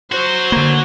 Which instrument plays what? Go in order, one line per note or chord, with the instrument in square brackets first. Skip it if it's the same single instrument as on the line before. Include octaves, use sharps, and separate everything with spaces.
[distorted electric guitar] F#3 F#4 [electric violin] C5
[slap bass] D3 A#3